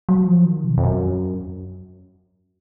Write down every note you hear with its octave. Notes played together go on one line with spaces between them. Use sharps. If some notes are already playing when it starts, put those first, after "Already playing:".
F#3
F3
D#3
B2
F2
F#2